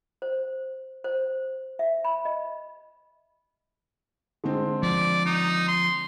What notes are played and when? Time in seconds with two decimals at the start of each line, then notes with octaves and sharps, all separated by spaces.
0.22 C5
1.04 C5
1.79 E5
2.05 B5
2.25 D#5
4.44 D3 G#3 C4
4.83 F3 D5
5.26 D#4
5.68 C6